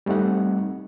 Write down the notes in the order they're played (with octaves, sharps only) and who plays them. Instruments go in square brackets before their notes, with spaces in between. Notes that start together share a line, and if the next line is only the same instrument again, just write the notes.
[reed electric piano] G3 A3 C4 D#4 F#5